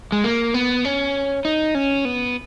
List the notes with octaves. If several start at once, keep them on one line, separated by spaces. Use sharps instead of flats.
G#3
A#3
B3
C#4
D#4
C#4
B3